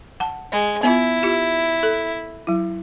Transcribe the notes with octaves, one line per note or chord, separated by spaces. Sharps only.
F#5 A5
G#3
B3 E4 F4
F4 G4 E5
A4
F#3 E4